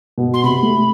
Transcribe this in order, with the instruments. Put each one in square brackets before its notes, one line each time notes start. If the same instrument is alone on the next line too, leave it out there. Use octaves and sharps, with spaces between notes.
[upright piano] B2
[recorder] C6
[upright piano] C3 [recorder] B5
[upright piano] A3